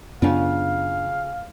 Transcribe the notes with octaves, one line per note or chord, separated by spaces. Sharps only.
F#2 C#3 B3 D4 F4 F5